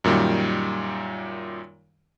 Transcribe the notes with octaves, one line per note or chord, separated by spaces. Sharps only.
F#2 A#2 D#3 G3